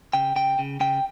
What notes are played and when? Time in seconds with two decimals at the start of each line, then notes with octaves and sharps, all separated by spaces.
0.13 C#3 G5
0.36 C#3 G5
0.59 C#3
0.80 C#3 G5